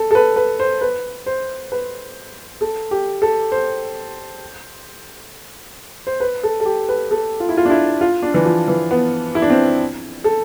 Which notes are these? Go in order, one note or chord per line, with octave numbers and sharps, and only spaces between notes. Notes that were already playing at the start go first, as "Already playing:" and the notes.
Already playing: A4
A4
B4
B4
C5
B4
C5
B4
A4
G4
A4
C5
C5
B4
A4
A4
G4
B4
A4
F4
E4
F4
D4
E4
F4
D4
E3
F3
E3
B3
E4
D4
C4
A4